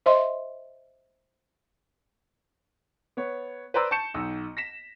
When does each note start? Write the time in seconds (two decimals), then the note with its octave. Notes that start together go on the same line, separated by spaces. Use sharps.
0.06 C5 D#5 E5 C6
3.17 B3 C#5
3.74 B4 C5 D5 A#5 E6
3.91 A5 C#6 G6 C#7 E7
4.14 B1 D#4 E6
4.57 A#6 B6 E7